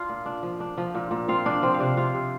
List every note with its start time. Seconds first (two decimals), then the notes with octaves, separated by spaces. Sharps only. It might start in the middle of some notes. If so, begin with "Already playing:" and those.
Already playing: D4 F4 F5
0.09 A#2
0.26 D4
0.43 F3
0.60 D4
0.78 F3
0.95 A#2
1.11 A#2
1.28 C4 F4 F5
1.46 F3 D4 D5
1.62 F3 C4 C5
1.74 F5
1.79 C3 D4 D5
1.97 C3 F4 F5
2.14 C3